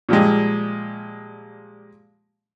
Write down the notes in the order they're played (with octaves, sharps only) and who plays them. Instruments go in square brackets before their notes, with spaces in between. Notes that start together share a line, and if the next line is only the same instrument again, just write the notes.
[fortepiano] A#2 F3 G3 G#3